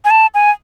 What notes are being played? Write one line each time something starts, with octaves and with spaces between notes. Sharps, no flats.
G#5
A5
G#5